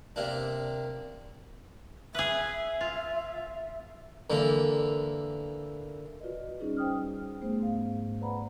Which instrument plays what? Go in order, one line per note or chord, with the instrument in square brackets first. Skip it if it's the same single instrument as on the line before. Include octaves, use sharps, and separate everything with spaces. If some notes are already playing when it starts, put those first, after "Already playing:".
[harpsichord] C3 A#3 D4
[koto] G#4 B4 [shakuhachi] E5
[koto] F4
[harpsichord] D3 E3 A#3
[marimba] F4 F#4 B4 D5 D#5
G3 C#4 D#4 F4 G#4
C5 G5 D#6 F6
A3 B3 G#4 C5
G#2 F5
B4 C5 D5 F#5 A#5 B5